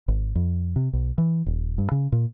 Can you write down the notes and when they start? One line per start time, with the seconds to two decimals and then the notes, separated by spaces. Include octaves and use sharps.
0.08 G#1
0.35 F2
0.76 C3
0.93 B1
1.18 E3
1.46 D#1
1.78 G2
1.92 C#3
2.12 A#2